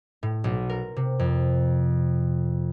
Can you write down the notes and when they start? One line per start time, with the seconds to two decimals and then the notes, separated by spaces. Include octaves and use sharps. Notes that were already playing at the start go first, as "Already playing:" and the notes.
0.23 A2
0.44 B1
0.69 A#4
0.96 C3
1.19 F2